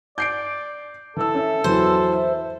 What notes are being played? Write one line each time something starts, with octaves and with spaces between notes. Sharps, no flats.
D5 G6 C7 D7
E3 A4 E6
C#4 E5
E2 E3 F#3 C5
E5